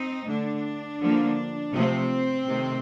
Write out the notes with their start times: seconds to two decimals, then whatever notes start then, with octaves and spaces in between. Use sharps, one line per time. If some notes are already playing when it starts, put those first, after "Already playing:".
Already playing: C4 D#4
0.28 D3 A3 D4
1.00 D3 F3 A#3
1.74 C3 F3 A3 C4
2.46 C3 D#3 A3